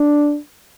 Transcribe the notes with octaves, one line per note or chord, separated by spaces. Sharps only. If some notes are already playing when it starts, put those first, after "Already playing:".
Already playing: D4